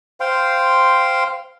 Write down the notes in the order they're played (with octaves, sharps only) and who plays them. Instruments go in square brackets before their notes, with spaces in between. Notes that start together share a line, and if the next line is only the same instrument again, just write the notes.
[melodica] C5 F5 G5 C6